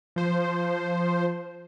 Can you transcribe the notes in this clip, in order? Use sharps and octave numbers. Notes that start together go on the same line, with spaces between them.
F3 C5